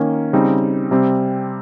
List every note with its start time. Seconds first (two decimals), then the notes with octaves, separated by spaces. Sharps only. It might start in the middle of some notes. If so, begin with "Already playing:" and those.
Already playing: D#3 A#3 C#4
0.33 C#3 G3 C4 D#4
0.91 C3 G3 C4